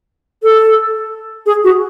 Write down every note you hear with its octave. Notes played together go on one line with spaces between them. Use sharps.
A4
G#4
F#4